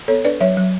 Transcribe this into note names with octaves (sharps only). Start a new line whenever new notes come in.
B3 A4 C#5
D4 B4 D5
F#3 C#5 E5
F#3